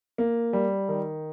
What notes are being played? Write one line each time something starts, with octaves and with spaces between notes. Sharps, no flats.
A#3
G3
D#3